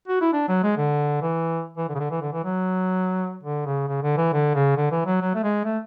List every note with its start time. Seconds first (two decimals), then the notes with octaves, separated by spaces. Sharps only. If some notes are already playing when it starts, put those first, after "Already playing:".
0.08 F#4
0.21 E4
0.33 D4
0.49 F#3
0.63 G#3
0.77 D3
1.22 E3
1.78 E3
1.89 D3
1.95 C#3
2.00 D3
2.11 E3
2.22 D3
2.33 E3
2.44 F#3
3.43 D3
3.66 C#3
3.88 C#3
4.02 D3
4.17 E3
4.33 D3
4.55 C#3
4.77 D3
4.91 E3
5.06 F#3
5.21 F#3
5.35 A3
5.44 G#3
5.65 A3